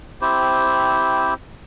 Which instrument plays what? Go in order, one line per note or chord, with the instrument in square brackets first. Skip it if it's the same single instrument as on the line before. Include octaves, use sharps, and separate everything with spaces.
[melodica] C4 E4 G4 C5